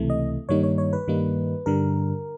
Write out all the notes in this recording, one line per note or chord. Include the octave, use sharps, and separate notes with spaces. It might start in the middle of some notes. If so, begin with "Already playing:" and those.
Already playing: C#2 C3 E3 A3
D#5
G2 D#3 G3 A#3 D#4 C#5
C#5
C#5
B4
G2 D#3 G3 A#3 D#4
G2 D3 G3 A#4